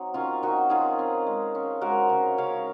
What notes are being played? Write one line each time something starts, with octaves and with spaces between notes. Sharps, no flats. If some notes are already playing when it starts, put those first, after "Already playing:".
Already playing: F#3 C4 D#4
D#3 C#4 F4
D#3 D#4 F#4
D#3 F4 G#4
C4
G#3
C#4
G#3 F#4 A#4
C#3
C#3 C#5 F5